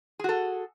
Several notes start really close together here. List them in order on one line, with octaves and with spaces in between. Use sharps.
G#4 F#4 A4